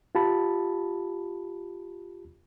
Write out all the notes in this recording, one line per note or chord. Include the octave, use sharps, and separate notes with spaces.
F4 G4 A5 B5